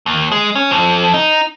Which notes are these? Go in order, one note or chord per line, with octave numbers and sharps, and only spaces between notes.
D#2
G#3
C#4
F2
D#4